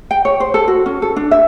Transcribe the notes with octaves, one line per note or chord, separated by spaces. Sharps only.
G5
C#5
C5
A4
F#4
C#4
A4
D4
E5